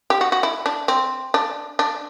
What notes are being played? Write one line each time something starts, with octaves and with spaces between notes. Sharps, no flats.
G4
F#4
F#4
E4
D4
C4
D4
D4